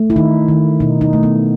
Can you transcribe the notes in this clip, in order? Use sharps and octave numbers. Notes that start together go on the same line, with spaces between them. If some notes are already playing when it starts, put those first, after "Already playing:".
Already playing: A3
E4
D#3 D#4
D#3
B2 D#4
D#4
A3
B3